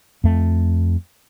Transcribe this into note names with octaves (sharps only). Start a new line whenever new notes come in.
F2 A3